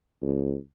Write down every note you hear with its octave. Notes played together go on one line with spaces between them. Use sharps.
C#2